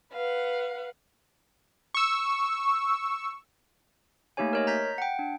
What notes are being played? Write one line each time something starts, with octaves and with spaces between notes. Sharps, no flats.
B4 F5 F#5
C#6 E6
A3 A#3 D#4 G4 C#5 G#5
A#4 C#5 D#5
A#5 G6 B6
F#5 G5
D4